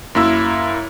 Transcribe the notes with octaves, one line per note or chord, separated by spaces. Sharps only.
F#2 A#3 E4 E6